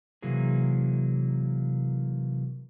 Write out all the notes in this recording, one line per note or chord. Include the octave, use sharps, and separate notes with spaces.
C3 E3 F#3 A#3 G#4